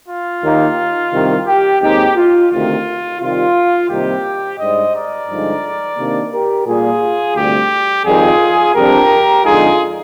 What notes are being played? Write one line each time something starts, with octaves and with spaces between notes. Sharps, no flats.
F4
D#2 D#3 A#3 D#4
C2 C3 D#3
G4
D#2 D#3 G#3 C4 D#4 G4
F4
D2 C3 D#3 F4
C3 D#3 G3 F4
C2 C3 D#3 G3 A#3 G4
G#2 G3 D4 C5 D#5
A#4 D5
G2 D3 F3 G#3 D#4
C3 D#3 A#3 D4
G4 A#4
A#2 G3 A#3 F4 G#4
D2 C3 G3 G4
F2 D#3 G3 F4 G#4
F2 C3 G3 D4 G4 A#4
F2 D3 G#3 D#4 F4 G#4